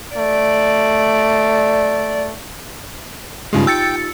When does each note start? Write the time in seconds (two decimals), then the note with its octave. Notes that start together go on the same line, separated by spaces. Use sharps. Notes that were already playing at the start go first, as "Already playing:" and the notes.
0.16 A3 D5
3.53 G2 C#3 G#3 D#4 F4 G4
3.67 G5 E6 A6 C#7